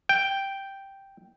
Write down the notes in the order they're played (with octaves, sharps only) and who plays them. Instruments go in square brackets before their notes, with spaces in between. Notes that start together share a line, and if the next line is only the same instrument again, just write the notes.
[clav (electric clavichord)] G5